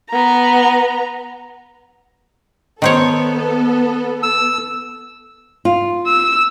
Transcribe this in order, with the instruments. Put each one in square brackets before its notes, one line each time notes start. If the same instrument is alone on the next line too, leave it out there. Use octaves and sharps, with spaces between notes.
[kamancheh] B3 A#5
[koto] D#3 C5 C#5 [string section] B3 A4
[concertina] E6
[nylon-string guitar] F4
[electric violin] E6